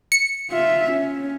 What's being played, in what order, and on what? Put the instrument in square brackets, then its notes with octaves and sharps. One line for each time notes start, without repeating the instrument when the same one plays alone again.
[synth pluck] C#7
[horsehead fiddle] F4 E5
C#4